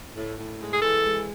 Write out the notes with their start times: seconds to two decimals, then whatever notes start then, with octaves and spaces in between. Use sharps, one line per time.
0.15 A2
0.38 A2
0.60 G#3
0.74 G#4
0.82 E3 A4
1.05 G#3